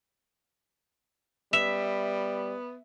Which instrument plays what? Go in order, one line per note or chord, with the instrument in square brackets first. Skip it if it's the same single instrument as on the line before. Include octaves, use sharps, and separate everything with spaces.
[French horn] G3 [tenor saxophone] B3 [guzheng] E5 [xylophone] E7 F7